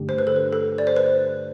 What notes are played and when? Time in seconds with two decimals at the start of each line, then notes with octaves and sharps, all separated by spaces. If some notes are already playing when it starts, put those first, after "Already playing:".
Already playing: G2 D3 A3 D4 G4
0.09 C5
0.18 B4
0.27 A4
0.36 B4
0.53 A4
0.78 D5
0.87 C5
0.96 B4